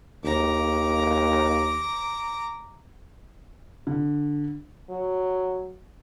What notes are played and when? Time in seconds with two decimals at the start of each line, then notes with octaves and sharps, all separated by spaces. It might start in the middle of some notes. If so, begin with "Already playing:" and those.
0.24 D#2 A#5 D6
3.87 D3
4.90 F#3